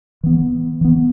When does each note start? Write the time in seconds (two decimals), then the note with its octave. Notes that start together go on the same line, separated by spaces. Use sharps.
0.23 E3 B3
0.81 E3 B3